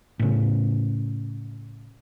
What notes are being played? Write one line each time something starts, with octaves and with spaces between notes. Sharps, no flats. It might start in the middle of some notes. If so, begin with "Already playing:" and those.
A2 C#3